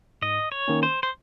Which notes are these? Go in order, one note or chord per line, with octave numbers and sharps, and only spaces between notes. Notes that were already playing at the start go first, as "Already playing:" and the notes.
G#2 D#5
C#5
D#3 A#3 C#4
C5
C5